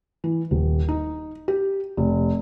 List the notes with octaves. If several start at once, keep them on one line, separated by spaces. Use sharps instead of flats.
E3
D#1
D#4
G4
F1